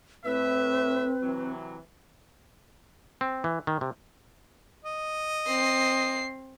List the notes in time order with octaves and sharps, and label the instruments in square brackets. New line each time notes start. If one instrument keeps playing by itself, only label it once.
[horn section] A2 E5 [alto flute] C4 [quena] B4
[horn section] C3 E3 F#3
[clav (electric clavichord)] C4
E3
D#3
C3
[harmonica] D#5
[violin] C4 C7